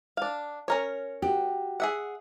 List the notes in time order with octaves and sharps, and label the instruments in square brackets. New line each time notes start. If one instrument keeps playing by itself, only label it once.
[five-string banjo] D4 F5
C#4 A#4 C#5
[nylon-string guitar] F#4 G4
[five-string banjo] G#4 E5 F#5